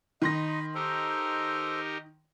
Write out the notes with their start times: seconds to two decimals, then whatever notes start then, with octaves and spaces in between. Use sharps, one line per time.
0.22 D#3 D#4 B5 C6 A#6
0.75 D#4 G4 A4 A#4 C5